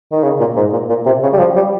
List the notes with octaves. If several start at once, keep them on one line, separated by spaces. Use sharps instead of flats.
D#3
C#3
A#2
G#2
A#2
A#2
C3
C#3
G3
F3
G3